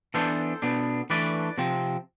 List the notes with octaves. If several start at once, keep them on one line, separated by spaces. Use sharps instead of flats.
E3 B3 D4 A4 C5
B2 B3 D4
E3 A3 D4 B4 D5
C3 F3 C4